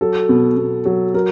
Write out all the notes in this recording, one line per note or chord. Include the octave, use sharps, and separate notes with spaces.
F#3 A4
B2
B2
F#3
F#3 A#4